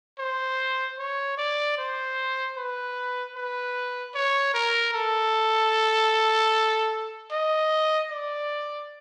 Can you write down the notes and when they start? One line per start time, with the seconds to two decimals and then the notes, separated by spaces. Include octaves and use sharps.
0.19 C5
0.98 C#5
1.38 D5
1.78 C5
2.57 B4
3.35 B4
4.15 C#5
4.54 A#4
4.94 A4
7.32 D#5
8.11 D5